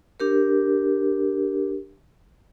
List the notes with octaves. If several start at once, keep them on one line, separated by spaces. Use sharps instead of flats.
D4 G4 A#4